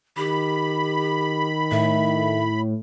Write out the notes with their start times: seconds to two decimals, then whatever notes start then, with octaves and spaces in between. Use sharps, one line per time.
0.17 D#3 G4 B5
1.72 A2 E5